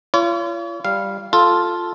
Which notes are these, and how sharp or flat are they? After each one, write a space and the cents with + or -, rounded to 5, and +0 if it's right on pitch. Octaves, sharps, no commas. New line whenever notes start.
F4 -40 C#5 +40
G3 +0 F5 -10
F4 +0 A4 +0